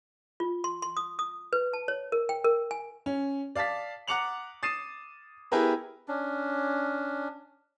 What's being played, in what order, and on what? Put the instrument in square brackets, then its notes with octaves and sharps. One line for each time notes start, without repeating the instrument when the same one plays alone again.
[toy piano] F4
C6
C6
D#6
D#6
B4
A5
C#5
A#4
G5
A#4
G#5
[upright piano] C#4
D5 F5 A5 A6 B6
F#5 A#5 D6 C#7 F7 F#7
D#6 A6 C7 D#7 E7
B3 E4 G4 G#4 A#4 B4
[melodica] C#4 D4